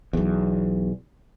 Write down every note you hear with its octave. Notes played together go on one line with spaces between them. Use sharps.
B1 E2